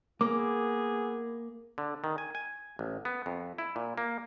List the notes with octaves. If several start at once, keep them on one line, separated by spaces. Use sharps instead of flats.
A#3 B3 E4 G#4 D6
D3
D#3
G#5
G#5
A1
B3
F2
E4
A#2
A#3